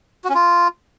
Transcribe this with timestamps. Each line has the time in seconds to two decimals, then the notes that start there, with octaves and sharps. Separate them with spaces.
0.24 F#4
0.30 C#4
0.35 F4